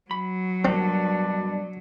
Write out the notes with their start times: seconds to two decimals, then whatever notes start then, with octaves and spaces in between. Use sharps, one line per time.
0.11 F#3 B5
0.65 G2 B2 A#3 C4 D4